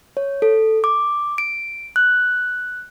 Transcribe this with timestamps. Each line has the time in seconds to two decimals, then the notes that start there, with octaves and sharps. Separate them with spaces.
0.17 C#5
0.42 A4
0.84 D6
1.38 D7
1.96 F#6